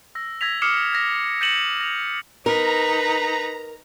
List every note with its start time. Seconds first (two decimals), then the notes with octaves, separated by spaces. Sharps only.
0.15 E6 A#6
0.41 E6 G#6 A#6 B6 F7
0.62 D6 D#6 F6 C7 C#7 E7
0.92 F6 G#6 A#6 B6
1.41 G6 A6 C#7 D#7 E7 F#7
1.81 A#6 F7
2.46 D#4 A#4 B4 A#5